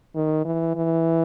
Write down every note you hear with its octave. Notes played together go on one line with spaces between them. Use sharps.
D#3
E3
E3